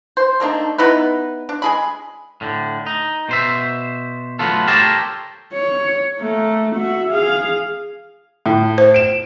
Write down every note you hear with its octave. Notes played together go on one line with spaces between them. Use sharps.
C5
A3 A#3 D4 D#4
B3 D#4 E4 B4
D4
G#3 G#4 B5
A2 D3
D#4
B2 C5 E5
F#3 A3 B3 F4 A4
G4 A4 A#4 C5 C#5 A5
C#5
A3 A#3
F#4 E5
G#4 F5
A2
C5
D7 E7